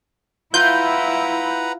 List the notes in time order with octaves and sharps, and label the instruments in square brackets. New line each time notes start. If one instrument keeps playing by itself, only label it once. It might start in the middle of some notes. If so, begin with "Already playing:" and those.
[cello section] E4 [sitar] F4 [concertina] B4 F#5 A#5 [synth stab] G6